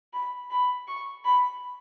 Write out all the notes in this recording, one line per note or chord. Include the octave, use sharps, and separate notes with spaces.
B5
B5
C#6
B5